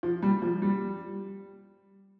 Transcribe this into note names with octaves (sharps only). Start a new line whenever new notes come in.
F3
G3
F3
G3